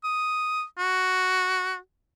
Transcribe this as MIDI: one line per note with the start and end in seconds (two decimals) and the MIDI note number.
0.04 0.64 87
0.78 1.77 66